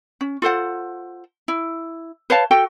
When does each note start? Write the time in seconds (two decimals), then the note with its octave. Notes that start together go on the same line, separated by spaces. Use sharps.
0.21 C#4
0.42 F4 A4 C5 F#5
1.48 E4
2.30 B4 C#5 F5 A5
2.51 F#4 A4 G5